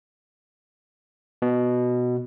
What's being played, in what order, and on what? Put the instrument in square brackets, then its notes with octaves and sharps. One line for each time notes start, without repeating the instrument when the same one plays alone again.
[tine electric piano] B2